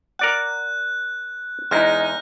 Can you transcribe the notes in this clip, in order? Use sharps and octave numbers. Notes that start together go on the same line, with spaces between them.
A#4 D5 F#5 F#6
E2 G#3 D#4 F6 G6 A#6